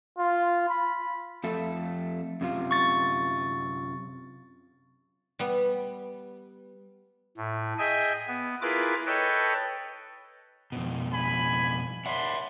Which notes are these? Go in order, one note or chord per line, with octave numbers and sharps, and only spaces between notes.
F4
B5
F2 A3 A4
F#2 C3 F4
C#6 A6
G3 B3
A2
G#4 D#5 E5 G5 G#5
B3
E4 F4 G#4 A#4 B4 D6
A4 B4 C#5 D#5 G5 A5
F2 B2
G#5 B5
D4 C#5 E5 F#5 B5 C6